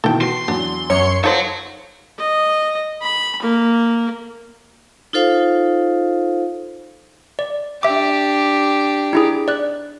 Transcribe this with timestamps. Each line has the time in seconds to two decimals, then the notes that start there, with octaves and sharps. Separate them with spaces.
0.04 B2 D#3 E3 A4 G5
0.21 F#4 C6
0.48 E2 F#3 D4
0.90 F#2 C#5 C#7
1.24 D#4 F4 A4 C5 C#5 F#5
2.19 D#5
3.01 B5
3.42 A#3
5.13 D#4 F4 A4 C5 F5
7.39 D5
7.83 D4 G4 E5 D6
9.13 D#4 E4 G#4
9.48 D5 F#6